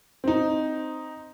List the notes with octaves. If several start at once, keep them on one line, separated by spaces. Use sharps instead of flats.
C4 D#4